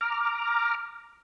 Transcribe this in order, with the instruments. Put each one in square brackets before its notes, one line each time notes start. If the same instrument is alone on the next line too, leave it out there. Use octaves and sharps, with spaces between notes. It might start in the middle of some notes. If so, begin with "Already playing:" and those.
[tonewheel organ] A#5 D6 F6